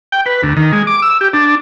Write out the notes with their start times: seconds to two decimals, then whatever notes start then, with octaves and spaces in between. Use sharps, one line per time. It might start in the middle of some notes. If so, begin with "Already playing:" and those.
0.12 G5
0.26 B4
0.43 D2
0.57 D#3
0.73 G#3
0.87 D6
1.02 E6
1.21 G4
1.33 D4